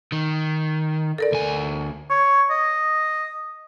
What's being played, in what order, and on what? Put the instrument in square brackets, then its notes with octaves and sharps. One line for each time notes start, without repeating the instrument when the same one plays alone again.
[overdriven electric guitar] D#3
[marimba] A4 A#4 D5
[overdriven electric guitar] D2 G#5
[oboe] C#5
D#5